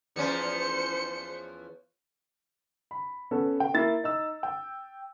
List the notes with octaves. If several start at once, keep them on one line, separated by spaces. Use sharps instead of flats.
E2 F3 C#4 C5 C#7
B5
B3 C#4 A4
G5
A#3 E4 E5 A6
D#4 E6
G5